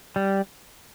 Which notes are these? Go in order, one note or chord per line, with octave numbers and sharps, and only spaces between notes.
G3